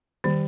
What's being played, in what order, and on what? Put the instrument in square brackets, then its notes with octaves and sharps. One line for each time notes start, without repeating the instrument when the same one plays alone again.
[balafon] D#3 [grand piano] G3